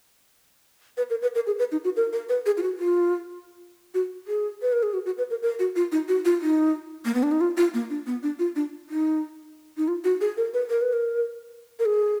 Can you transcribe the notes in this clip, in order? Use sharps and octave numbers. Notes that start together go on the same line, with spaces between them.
B4
A#4
B4
A#4
G#4
B4
D#4
F#4
A#4
A#4
B4
G#4
F4
F#4
F4
F#4
G#4
B4
A#4
G#4
F#4
F#4
B4
A#4
A#4
F#4
F4
D#4
F#4
F4
D#4
A#3
B3
D4
D#4
F4
F4
A#3
D4
B3
D4
F4
D4
D#4
D#4
F4
F#4
G#4
A#4
B4
A#4
B4
A#4
A#4
G#4